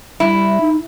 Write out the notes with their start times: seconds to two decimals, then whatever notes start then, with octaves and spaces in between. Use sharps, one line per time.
0.20 G3 E4
0.61 D#4